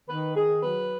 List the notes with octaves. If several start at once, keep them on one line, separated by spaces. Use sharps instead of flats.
D#3 B4
D#3 G#4
F#3 B4